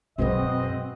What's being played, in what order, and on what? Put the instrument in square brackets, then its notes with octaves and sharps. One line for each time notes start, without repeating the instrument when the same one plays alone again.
[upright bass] F#2 B2 [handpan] G#3 F#4 B4 [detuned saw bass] C4 [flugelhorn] D#5